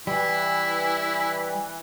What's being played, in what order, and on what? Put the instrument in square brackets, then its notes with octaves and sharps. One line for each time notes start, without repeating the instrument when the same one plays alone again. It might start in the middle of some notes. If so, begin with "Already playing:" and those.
[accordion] E3 [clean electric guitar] G3 [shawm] E4